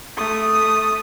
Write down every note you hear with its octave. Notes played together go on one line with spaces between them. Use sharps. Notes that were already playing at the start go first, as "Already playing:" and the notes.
A3 D#6